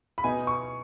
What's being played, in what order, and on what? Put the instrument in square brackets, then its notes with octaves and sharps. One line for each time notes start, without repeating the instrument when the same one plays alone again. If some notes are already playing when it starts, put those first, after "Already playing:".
[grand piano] B5
B2 B3 D#4 G#5
C#6